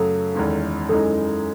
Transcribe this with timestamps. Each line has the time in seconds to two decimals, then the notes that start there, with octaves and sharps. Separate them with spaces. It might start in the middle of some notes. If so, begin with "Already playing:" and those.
Already playing: F#2 C#3 F#3 A3 A4
0.35 E2 D#3 G#3 C#4
0.89 F#2 E3 G#3 D#4 A4